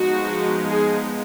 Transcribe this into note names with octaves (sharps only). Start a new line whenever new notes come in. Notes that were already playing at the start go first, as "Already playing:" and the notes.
Already playing: F3 G#3 B3 D#4 F#4
G#4